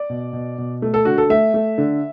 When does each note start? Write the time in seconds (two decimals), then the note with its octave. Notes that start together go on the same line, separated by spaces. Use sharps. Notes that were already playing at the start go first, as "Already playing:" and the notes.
Already playing: D5
0.10 B2
0.33 B2
0.58 B2
0.82 A3
0.94 A4
1.05 D3 F#4
1.18 A4
1.30 A3 E5
1.54 A3
1.78 D3